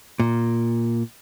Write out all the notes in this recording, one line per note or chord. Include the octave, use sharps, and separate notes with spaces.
A#2